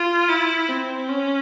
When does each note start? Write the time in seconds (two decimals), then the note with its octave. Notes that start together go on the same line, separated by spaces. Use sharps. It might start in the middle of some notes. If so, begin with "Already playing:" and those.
Already playing: F4
0.28 E4
0.69 C4
1.09 C#4